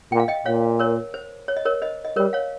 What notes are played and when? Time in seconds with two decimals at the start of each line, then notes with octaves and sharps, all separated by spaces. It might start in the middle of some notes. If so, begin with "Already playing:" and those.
0.12 A#2 G5
0.20 F5
0.28 D#5 G5
0.46 A#2 C#5 F5
0.79 A#4 C#5
1.14 C5
1.48 C#5
1.57 D#5
1.65 A#4 C#5
1.82 C5 D#5
2.05 D#5
2.16 G3 A#4 C#5
2.33 C#5 F5